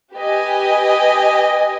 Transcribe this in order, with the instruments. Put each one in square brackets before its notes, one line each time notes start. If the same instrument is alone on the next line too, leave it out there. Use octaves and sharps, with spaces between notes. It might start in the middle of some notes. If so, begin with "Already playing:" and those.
[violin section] G4 B4 D#5 G#5